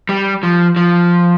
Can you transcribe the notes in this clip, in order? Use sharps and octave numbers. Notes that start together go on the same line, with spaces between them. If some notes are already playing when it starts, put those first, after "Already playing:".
G3
F3
F3